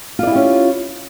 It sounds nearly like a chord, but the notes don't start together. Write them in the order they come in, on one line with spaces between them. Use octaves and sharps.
F4 D5 E4 G4 C#4